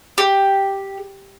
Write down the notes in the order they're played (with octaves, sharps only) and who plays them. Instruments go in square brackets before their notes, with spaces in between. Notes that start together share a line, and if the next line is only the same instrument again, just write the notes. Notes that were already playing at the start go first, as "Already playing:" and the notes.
[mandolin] G4